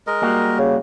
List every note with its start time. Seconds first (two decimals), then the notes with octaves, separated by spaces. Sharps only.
0.07 G#3 A#4 D#5
0.22 G3 A#3 F#4
0.59 C#3